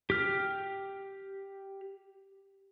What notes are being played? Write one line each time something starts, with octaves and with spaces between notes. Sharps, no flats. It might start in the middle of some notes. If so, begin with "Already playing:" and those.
G4 F6